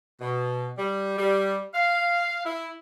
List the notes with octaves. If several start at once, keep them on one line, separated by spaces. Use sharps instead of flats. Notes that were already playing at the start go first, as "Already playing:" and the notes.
B2
G3
G3
F5
E4